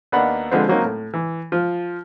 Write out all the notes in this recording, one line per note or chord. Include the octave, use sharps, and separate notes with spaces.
D#2 A#3 B3 D4 F#5 B5
D3 F3 G#3 B3 C4
F#3 A#3 C4 C#4 D#4
A2
E3
F3 F4